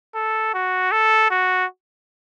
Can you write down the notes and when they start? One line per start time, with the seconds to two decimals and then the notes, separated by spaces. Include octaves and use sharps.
0.15 A4
0.54 F#4
0.92 A4
1.31 F#4